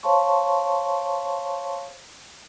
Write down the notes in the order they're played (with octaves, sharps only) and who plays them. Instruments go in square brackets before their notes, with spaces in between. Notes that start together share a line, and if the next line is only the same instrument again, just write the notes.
[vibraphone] C5 C#5 F5 A5 C6 C#6